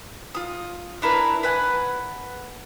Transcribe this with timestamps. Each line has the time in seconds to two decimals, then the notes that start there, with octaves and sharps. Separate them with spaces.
0.35 F4 D#6
1.02 D4 E4 A#4 B4
1.43 B4 F#5 G#5